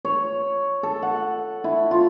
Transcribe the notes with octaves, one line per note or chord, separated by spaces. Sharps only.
C#5
A4
F#5
E4
F4